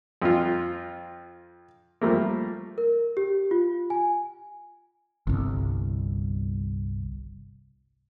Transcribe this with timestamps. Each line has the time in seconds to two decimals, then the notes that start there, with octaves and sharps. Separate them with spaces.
0.22 F2 F4
2.01 F3 G3 A3 A#3
2.78 A#4
3.17 G4
3.51 F4
3.90 G#5
5.27 G1 C2